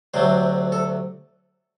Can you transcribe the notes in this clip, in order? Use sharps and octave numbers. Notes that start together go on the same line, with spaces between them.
D2 C3 F#3 A3 C5
A4